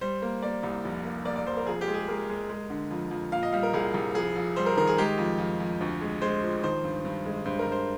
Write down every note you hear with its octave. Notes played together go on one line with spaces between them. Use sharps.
G3 C5
A#3
A#3 D5
C2
F1
A#3
A#3 D5
D5
F1 C5
A#4
F2 G#4
G4
G#3
G#4
G#3 A#4
G#3
G#3
D3
F2
F2
A#2 F5
D#5
G3 F5
A#4
C2 G#4
C2
F2 G#4
F2
G3 C5
A#4
D#3 A#4
G#4
G#3 G4
F2
F2
F2
D2
G#3
G#3 C5
F3
D#3 C5
G2
G2
G#3
G2 C5
A#4
G2
C5